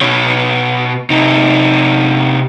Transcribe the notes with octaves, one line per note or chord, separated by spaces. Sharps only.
B2 C#5
C3 D#4